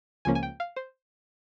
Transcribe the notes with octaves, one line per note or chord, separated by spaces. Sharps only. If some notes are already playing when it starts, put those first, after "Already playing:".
C#2 C#3 F3 A#3 C#4 G#5
G#5
G5
F5
C5